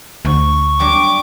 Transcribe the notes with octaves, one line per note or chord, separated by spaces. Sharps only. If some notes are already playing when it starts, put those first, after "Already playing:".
D2 C#6
F#3 G3 D4 D6